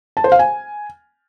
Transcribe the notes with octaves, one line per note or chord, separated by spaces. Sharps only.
A5
C5
F5
G#5